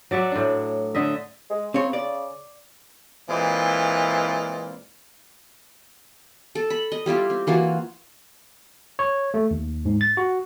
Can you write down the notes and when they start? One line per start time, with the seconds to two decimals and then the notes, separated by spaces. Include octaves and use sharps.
0.11 F#3 D5 E5 F#5
0.31 A2 D4
0.95 D3 D#5 E5
1.50 G#3
1.74 C#3 C4 C#5
1.93 D5
3.30 A#2 E3 G#3 C4 E4 F4
6.55 A4
6.70 B5
6.92 D#5
7.06 G3 E4 F4 G4
7.30 C4
7.47 E3 A#3 F4 F#4
8.99 C#5
9.34 A3
9.51 D#2
9.85 G#2
10.01 A6
10.17 F#4